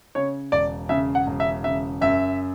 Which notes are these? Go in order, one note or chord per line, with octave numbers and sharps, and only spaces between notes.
C#3 C#5
E1 D5
C#3 E5
F#5
E1
E5
C#3 E5
F#2 E5